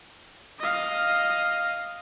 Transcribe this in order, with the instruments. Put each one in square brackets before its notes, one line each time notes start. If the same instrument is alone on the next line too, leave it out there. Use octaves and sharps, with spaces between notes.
[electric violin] D#5 F5